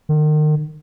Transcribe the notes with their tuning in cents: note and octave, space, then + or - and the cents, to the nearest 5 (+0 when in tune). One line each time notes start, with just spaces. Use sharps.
D#3 -35